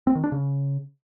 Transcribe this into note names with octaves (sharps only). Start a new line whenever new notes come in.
C4
D#3
D4
C#3